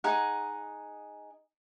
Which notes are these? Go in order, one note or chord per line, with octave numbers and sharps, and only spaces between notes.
D#4 G#4 F#5